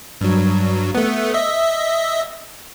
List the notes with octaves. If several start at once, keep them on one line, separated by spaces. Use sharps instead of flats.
G2 F#3
A3 B3
D#5 E5